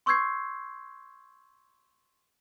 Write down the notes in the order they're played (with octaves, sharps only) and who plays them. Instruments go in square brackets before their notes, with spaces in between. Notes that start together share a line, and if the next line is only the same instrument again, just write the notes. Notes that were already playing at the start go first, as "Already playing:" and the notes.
[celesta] C6 C#6 E6 G6 G#6 C7